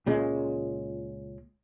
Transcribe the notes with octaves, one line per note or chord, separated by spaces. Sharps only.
C#2 A#2 C#3 G#3